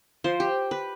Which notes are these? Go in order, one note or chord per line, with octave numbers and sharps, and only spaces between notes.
F3 C5
G4
B4